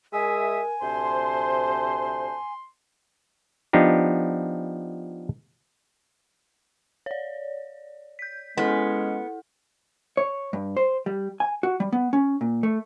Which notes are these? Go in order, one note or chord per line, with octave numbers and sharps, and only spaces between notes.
G#3 A#4 E5 G#5 D#6
D2 C3 C5 A5 C6
F3 B3 D4 D#4 G4
C#5 D5
G6 B6
G#3 B3 C#4 E4 A4
C#5
G2
C5
G3
G#5
F#4
G3
B3
C#4
A#2
A3